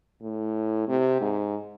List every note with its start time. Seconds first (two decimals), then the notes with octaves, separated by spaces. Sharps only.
0.22 A2
0.88 C3
1.21 G#2